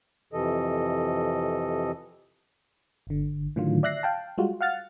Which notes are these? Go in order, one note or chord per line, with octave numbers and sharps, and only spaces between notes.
F2 C3 E3 A4 D#5
G1 D3
A2 D3 D#3 F#3 F4
D5 E5 F#6 A#6 C7
F5 G5 A5
G3 G#3 F4 F#4
F5 F#5 F6 A6